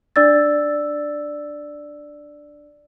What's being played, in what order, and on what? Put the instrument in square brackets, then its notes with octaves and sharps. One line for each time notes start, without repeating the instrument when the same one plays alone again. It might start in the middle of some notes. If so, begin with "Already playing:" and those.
[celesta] D4 D5 E6 A6